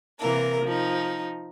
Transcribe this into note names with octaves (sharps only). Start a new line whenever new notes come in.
C3 E3 A#3 A#4
F3 D#4